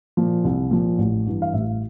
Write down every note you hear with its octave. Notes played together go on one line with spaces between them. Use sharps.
A#2 F3
C2
A#2 F3
A1
G2 E3
F5
A1 E5